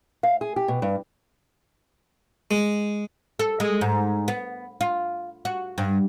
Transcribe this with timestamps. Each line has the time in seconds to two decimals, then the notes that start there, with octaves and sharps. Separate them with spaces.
0.23 F5
0.41 G#4
0.56 G4
0.68 B2
0.82 G2
2.51 G#3
3.39 A4
3.60 G#3
3.81 G#2
4.28 B3
4.81 F4
5.45 F#4
5.78 G2